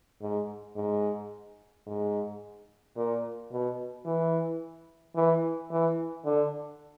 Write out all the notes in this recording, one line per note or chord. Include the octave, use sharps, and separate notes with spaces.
G#2
G#2
G#2
A#2
B2
E3
E3
E3
D3